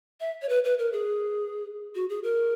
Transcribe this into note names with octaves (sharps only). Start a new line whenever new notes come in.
E5
C#5
B4
B4
A#4
G#4
F#4
G#4
A#4